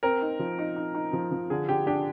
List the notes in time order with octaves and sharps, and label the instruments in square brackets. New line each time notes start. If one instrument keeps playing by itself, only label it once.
[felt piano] C4 [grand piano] A#4
[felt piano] D#4
F3
D#4
D#4
D#4
F3
F3
[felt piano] D3 [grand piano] G#4
[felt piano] D3 [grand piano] G4
[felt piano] D4 [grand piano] G4